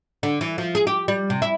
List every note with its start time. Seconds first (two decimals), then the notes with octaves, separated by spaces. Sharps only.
0.23 D3
0.41 E3
0.58 F3
0.75 G#4
0.87 G4
1.08 G3
1.30 C3
1.42 E4